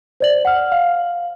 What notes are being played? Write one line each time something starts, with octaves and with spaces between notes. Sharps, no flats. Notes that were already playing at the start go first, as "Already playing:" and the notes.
C5 D5 F#7
F#5 F6
F5